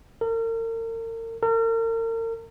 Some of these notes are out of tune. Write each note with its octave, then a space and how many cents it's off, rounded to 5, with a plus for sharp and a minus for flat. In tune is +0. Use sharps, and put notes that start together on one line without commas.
A#4 -40
A#4 -40